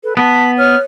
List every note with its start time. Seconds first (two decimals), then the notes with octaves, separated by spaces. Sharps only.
0.04 A4 B4
0.17 B3 A5 B6
0.58 C#5 F6